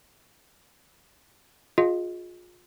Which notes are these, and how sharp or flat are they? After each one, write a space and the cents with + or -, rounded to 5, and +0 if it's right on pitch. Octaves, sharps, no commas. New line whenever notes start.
F4 +30 G#4 +0 D#5 +15